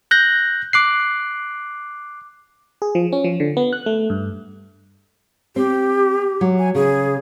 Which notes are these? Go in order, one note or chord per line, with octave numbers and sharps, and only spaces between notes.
F#6 G6 A#6
D6 F#6 C7
G#4
F3
C#4
F3
D3
B3
F#6
A3
G2
C4 G4
F#3
G#5
C#3 G#4